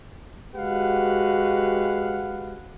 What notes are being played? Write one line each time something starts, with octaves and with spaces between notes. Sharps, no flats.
G#3 F#4 G4 B4 F5 F#5